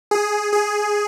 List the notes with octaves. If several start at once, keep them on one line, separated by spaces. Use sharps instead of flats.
G#4
G#4